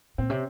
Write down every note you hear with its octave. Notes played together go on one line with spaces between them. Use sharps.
A#2 C4
C3 C#4